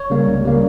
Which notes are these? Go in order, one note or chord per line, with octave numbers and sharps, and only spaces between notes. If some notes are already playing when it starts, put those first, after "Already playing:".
Already playing: C#5
C#3 G3 A#3
C#2
C#3 G3 A#3